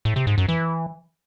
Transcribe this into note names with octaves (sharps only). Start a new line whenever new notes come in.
A2
C3
G#2
F#2
E3